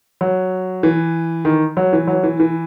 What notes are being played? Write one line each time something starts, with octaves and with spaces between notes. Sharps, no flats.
F#3
E3
D#3
F#3
E3
F#3
E3
E3